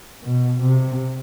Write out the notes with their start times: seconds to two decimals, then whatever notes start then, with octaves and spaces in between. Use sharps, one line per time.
0.23 B2
0.61 C3